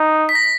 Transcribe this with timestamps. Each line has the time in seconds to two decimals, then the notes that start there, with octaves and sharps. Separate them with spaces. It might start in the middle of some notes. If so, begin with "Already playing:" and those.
Already playing: D#4
0.29 B6
0.35 A#6